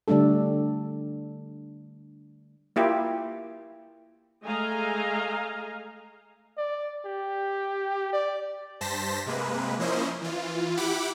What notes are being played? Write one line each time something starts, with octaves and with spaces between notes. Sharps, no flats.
D3 G3 A3 D4 A4
A#3 E4 F4 G4
G#3 A3 D#5 F5 G#5 A#5
D5
G4
D5
G2 C5 A5 A#6 B6
C3 G#3 A#3 B4
F3 A#3 C#4 E4 C5 D#5
E3 F4
E4 G4 F#5 B5 D6